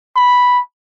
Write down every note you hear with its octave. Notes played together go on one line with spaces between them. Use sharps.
B5